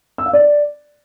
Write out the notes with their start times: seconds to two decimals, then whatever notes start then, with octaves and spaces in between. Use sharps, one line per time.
0.18 E6
0.26 F5
0.33 D5